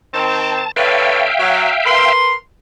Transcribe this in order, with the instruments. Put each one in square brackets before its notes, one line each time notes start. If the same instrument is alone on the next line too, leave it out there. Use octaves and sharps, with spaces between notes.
[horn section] D#3 C4 [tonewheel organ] A5
[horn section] D3 B4 C#5 [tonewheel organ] E5 F5 G5
[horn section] F#3
A#4 B4 C6